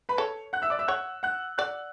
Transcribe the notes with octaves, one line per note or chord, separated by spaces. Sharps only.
B4 B5
A4 C#5 C#6
F#5 F#6
E5 E6
D5 D6
E5 E6
C#5 F#5 F#6
F#5 F#6
D5 F#5 F#6